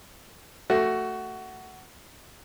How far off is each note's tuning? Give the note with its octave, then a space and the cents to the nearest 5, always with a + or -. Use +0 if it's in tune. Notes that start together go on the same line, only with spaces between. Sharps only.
A3 +15 F#4 +15